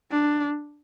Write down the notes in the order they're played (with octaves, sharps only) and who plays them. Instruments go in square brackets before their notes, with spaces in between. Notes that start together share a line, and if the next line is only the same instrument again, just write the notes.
[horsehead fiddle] D4